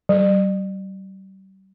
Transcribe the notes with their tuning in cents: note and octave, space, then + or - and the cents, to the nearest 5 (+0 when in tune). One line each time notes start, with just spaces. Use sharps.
G3 -40